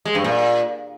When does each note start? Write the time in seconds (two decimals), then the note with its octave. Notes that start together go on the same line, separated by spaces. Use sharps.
0.05 G#3
0.15 G2
0.24 A#2